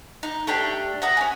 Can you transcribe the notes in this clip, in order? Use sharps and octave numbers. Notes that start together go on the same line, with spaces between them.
D#4
A3 D4 G4 G5
E5 F#5 A#5 D#6
C#4 G#5